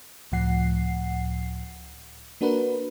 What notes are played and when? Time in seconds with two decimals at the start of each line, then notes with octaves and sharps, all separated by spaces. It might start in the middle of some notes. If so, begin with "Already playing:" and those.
0.32 C#2 A2 F3 F#5 C7
2.41 A#3 D4 F#4 A#4 B4